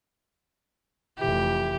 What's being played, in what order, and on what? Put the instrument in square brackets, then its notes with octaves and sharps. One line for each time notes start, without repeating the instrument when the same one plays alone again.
[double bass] F1 E3 [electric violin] G4